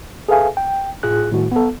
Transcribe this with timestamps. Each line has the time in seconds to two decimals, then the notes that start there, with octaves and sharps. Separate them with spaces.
0.29 G#4 A4 B4 E5 F5 G#5
0.57 G5
1.03 A2 F4 G#4 F#6
1.32 A2 D#3 G3 F#4
1.52 B3 A4